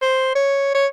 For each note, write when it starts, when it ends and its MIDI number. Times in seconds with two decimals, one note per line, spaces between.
0.02 0.30 72
0.35 0.74 73
0.75 0.86 73